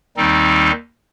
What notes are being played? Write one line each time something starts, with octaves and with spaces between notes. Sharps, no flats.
D#2 D#3 G3 C4 D#4